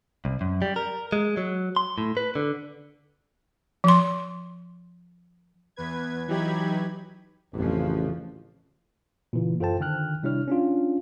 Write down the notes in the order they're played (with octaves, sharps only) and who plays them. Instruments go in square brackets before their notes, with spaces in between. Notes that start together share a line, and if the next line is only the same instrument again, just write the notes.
[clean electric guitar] C2
F#2
G3
A#4
G#3
F#3
C6
A2
B4
D3
[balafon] F3 C6
[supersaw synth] E2 B4 G#6
E3 F#3 D#4 G4 B5 G#6
[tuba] A1 [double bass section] F2 C#3 F3
[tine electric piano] A#2 C#3 E3
F#2 F4 A4 C5 G5 A5
D3 D#3 G5 F6 F#6
C3 G3 D4 E4 C#5 F6
C#4 D4 F4